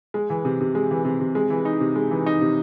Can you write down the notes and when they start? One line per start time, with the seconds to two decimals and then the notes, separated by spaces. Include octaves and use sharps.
0.14 G#3
0.30 E3
0.45 C3
0.61 C3
0.75 G#3
0.91 E3
1.05 C3
1.21 C3
1.35 G#3
1.50 E3
1.65 D#4
1.80 C3
1.96 G#3
2.11 E3
2.26 D#4
2.41 C3